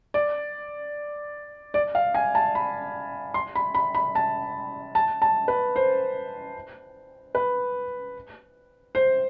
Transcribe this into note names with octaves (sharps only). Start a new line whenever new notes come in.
D5
D5
F5
G#5
A5
B5
C6
B5
B5
B5
A5
A5
A5
B4
C5
B4
C5